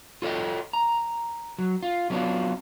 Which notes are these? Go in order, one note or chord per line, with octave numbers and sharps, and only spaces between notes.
F4 A4 C#5 D#5 G5
A#5
F#3
F4
F#3 A3 B3 C#4 D4 F4